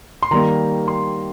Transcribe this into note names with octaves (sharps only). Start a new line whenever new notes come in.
C6
D#3 G3 A#3 A#5
C6